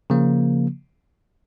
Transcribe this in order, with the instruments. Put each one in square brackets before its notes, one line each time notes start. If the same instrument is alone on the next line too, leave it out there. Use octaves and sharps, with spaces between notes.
[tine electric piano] C#3 F3 A#3